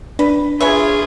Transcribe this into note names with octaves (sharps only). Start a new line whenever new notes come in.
D4 B4
F4 G#4 B4 C#5 E5 G#5